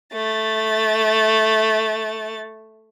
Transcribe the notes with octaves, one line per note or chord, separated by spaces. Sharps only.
A3 A6